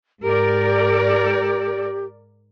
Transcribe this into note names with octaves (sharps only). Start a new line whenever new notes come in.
G#2 G4 A#4 D5